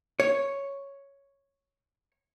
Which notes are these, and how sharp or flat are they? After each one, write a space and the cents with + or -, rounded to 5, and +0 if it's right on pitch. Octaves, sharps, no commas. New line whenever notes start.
C#5 +0